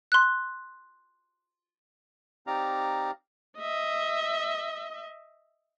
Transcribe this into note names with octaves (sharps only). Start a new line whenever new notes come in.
C6 F#6
C4 D#4 G4 D5 F5 A#5
D#5 E5